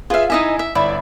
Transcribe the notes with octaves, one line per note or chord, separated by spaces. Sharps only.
F4 G#4 B4 E5 F5
D#4 E4 D#5 E5 G#5
E5
G1 E4 D5 E5